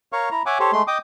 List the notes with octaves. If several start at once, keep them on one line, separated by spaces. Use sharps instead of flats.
A#4 C#5 F5 C#6
E4 A#5
C#5 E5 F#5 G#5 D6
G4 A4 C5 C#5
G#3 A3 C6
D#5 G5 D6 D#6